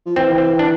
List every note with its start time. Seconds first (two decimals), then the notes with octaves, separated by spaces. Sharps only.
0.06 F3
0.16 E3 C4
0.38 C4
0.59 D4